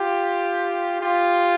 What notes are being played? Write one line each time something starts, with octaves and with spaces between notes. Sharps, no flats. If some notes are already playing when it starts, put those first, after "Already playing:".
Already playing: F4 G4
F4 G4